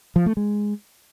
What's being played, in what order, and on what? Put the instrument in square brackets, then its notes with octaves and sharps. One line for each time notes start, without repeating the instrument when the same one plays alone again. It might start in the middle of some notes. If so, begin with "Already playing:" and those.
[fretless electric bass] F3
A3
G#3